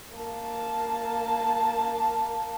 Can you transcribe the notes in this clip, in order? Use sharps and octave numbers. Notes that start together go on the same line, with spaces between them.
A#3 A5